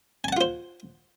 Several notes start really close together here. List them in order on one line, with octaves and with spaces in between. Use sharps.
G#5 A5 F#5 F4 C5